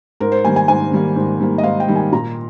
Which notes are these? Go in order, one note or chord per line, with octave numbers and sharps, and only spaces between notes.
G#2 A#4
C5
D#3 G3 A#3 G#5
G#5
G#2 G#5
D#3 G3 A#3
G#2
D#3 G3 A#3
D#5
G#2 F5
G5
D#3 G3 A#3
G#5
A#2 A#5